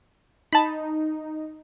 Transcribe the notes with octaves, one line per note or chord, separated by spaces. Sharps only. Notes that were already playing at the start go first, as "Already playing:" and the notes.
D#4 A5 B5